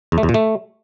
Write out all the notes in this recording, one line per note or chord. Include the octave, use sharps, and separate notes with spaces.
E2
A3
E2
A#2
A3